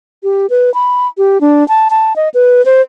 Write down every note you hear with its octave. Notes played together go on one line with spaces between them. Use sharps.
G4
B4
B5
G4
D4
A5
A5
D#5
B4
C5